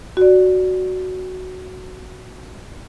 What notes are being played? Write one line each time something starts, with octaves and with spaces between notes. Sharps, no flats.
F#4 D5